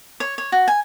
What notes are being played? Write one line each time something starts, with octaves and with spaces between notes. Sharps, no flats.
C#5
C#5
F#4
G#5